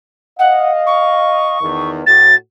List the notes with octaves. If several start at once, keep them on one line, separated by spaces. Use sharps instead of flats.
D#5 F5 F#5
C#6
E2 D#3
A2 F#4 A6